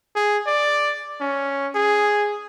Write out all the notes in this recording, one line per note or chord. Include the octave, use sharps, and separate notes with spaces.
G#4
D5
C#4
G#4